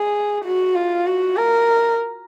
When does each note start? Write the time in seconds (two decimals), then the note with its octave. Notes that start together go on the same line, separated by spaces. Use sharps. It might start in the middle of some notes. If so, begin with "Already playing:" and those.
Already playing: G#4
0.44 F#4
0.75 F4
1.07 F#4
1.37 A#4